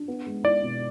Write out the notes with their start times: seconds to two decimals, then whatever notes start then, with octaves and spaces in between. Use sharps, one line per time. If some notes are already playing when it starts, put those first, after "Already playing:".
Already playing: D4
0.08 B3
0.26 G#3
0.44 E4 D5
0.63 B2